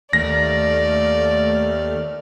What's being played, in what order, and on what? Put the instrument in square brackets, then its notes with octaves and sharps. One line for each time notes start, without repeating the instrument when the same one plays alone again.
[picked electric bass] D#2 [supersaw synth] A3 F6 [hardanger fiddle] D5 [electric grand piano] A#6